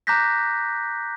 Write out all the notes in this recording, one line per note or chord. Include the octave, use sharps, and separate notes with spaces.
A#5 D6 F#6 G6 A#6 B6